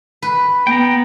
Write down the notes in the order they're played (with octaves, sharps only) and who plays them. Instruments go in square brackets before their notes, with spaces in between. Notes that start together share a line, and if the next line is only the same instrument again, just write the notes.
[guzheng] B4
[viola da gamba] B3 [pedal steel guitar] G5 A#5